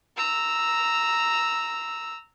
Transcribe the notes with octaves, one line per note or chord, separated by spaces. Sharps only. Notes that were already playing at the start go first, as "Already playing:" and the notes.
A#5 E6